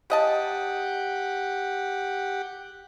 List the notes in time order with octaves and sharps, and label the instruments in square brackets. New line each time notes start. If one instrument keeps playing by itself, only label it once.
[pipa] C#3 D#5 A5 [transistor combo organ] G4 F#5